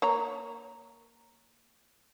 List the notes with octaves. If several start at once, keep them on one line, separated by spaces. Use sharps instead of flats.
A#3 C#5 A#5